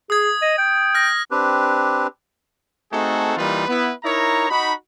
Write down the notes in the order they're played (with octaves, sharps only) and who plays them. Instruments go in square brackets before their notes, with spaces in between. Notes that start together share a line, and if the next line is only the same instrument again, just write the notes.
[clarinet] G#4 [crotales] D#6 G#6
[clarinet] D#5
G5
[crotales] F6 A#6
[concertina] C4 D4 G4 B4
[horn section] A3 C4 D#4 F#4 G#4 A4
E3 G3 A#3 D#4 F4 B4
B3 E4 B4
D#4 E4 A#4 C#5 A#5
D#4 F#4 B5